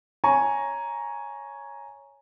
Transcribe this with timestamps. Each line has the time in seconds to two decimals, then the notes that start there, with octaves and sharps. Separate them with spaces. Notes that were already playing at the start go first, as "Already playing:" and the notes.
0.24 C#5 G#5 A#5 C#6